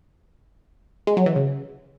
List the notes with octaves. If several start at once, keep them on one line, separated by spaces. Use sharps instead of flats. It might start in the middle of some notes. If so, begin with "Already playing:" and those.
G#3
F#3
E3
C#3